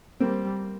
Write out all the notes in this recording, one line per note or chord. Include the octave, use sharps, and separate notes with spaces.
G3 A#3 C4